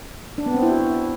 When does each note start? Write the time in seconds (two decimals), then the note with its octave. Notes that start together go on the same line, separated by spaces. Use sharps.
0.38 D4
0.46 B3
0.54 C4
0.62 E4
0.71 F#4